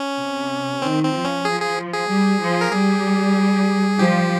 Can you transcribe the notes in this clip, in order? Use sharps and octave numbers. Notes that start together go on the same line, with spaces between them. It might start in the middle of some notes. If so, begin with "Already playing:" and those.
Already playing: C#4
C3
D#3 C4
C4
F3
C#4
F3 G#4
G#4
G#4
G3
F3
A#4
G3 G#4
F3 G4